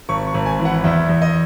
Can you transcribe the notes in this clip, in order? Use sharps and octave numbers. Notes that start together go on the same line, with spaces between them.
G#1 C#6
C#6
G#1
G#5
E3
F#5
E2 E5
E2
D#5